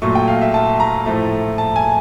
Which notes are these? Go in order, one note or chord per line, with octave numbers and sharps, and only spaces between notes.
A#2 F#3 A3 C#6
G5
F5
E5
A5
A#5
A2 F3 A3
A5
G#5